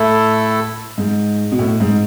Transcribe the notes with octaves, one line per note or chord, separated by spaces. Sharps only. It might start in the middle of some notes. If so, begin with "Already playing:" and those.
Already playing: A2 A3 E4 A4
G#2
B2
A2
G#2